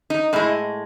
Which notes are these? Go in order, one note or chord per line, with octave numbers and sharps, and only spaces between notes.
D#4
A2 G#3 E4